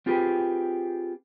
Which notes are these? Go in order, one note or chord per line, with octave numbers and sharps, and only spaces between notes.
C4 F4 G4 G#4 B4